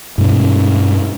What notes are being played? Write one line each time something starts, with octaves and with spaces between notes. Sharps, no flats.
G2 B2 G#3 C#4